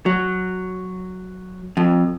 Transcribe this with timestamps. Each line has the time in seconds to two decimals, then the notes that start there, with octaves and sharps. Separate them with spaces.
0.06 F#3
1.77 F2